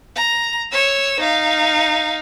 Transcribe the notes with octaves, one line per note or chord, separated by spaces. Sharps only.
A#5
C#5 E6
D#4 F5